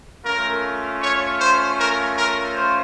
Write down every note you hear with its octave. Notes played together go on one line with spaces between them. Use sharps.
A3 C#4 F4 A#4
C#5
C5
A#4
A#4
C5